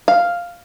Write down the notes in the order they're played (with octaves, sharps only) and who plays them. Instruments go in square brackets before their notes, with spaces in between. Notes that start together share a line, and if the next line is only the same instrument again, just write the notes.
[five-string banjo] F5